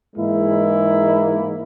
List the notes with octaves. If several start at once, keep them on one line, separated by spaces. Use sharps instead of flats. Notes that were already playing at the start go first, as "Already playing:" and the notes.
G#2 E3 G#3 A#3 E4